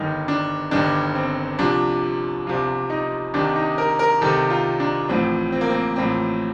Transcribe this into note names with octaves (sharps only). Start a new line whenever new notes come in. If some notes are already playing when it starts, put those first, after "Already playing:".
Already playing: G1 G2 D#3 D#4
D4
G1 G2 D#3 D4
C4
C2 C3 F3 D4
C2 C3 F3 F4
D#4
C2 C3 D#3 D4
D#4
A#4
A#4
C2 C3 D#3 A4
F4
D4
A1 A2 F3 C4
C4
A#3
C4
A1 A2 F3 C4